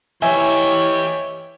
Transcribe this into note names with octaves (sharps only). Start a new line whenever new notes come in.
E3 G4 C#5 D#5 E5 G#5